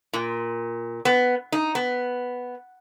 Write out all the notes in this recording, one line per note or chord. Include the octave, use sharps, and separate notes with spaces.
A#2
B3
D#4
B3